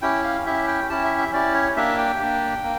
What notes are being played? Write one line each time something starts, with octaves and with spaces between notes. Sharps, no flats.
C#4 E4 G4 G5
F5
C#4 E4 G4 E5
G5
C#4 E4 G4 A5
E5
E5
C#4 E4 G4 D5
C#5
A#3 D4 G4 E5
G5
A#3 D4 G4
A#3